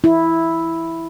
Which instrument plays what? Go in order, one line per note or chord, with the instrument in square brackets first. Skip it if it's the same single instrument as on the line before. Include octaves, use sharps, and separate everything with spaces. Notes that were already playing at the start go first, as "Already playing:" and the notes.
[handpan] E4